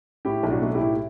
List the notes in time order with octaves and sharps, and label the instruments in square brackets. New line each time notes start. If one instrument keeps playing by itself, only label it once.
[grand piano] A2 E4 G4
B1
D4 F#4
A3
E4 G4
A2